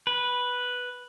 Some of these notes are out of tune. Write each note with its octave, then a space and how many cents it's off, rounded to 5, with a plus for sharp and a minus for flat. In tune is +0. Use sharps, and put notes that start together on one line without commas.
B4 -5